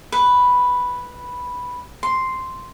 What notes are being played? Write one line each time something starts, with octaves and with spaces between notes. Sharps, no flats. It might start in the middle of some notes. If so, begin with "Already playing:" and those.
B4
C6